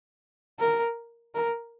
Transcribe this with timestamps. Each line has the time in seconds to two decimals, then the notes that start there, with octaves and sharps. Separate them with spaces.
0.59 A#4
1.35 A#4